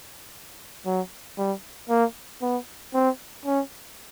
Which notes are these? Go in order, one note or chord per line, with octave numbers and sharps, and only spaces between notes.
F#3
G3
A#3
B3
C4
C#4